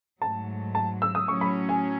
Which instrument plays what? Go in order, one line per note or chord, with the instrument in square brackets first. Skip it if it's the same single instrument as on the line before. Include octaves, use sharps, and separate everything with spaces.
[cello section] G#2 F#3 A3 [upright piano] A5
[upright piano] A5
E6
D#6
[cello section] A2 F#3 C#4 [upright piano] C#6
[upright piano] B5
G#5